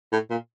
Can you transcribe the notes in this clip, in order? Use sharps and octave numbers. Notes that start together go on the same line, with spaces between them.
A2
A#2